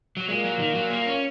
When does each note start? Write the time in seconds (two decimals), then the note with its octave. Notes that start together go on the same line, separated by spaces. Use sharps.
0.17 F#3
0.28 A#2 G#3
0.44 F#3
0.59 D#3
0.75 F#3
0.90 A#3
1.06 C#4